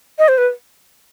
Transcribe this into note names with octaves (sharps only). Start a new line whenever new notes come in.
D#5
C5
B4